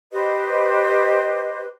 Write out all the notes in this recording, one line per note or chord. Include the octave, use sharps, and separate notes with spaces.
G4 B4 C5 D#5